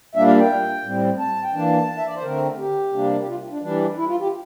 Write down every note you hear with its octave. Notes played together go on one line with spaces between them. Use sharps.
A#2 G3 A#3 D4 E5
F5
G5
A2 G3 C4
A5
G5
E3 A#3 D4 A5
E5
D5
C5
D3 A3 C4 A#4
G4
C3 G3 A#3 D4
G4
F4
D4
E3 G3 D4
E4
F4
G4